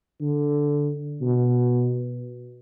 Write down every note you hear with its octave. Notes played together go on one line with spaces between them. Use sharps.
D3
B2